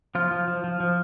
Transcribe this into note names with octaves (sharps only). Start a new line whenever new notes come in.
F3 F4
F3
F3
F3
F3